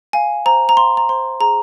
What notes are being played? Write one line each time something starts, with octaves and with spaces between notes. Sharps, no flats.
F5 G#5
C5 A#5
A#5
F5 C6
A#5
C5 C6
G#4 A#5